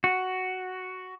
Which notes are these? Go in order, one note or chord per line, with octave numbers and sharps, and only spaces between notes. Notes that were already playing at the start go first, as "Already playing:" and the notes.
F#4